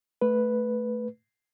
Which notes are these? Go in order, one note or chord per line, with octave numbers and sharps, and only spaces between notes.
A3 B4